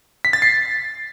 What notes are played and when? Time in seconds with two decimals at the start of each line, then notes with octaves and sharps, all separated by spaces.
0.25 B6
0.33 A6
0.42 C7